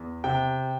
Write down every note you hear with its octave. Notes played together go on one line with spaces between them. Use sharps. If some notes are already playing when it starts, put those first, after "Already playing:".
Already playing: E2
C3 G5